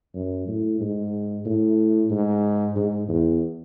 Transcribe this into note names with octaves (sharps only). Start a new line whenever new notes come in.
F#2
A2
G#2
A2
G#2
G#2
E2